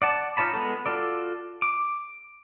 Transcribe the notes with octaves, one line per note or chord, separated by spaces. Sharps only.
D5 F#5 A5
D#4 F4 C#5 A5 B5
G#3 B3 A4
F4 F#4 A4 D5
D6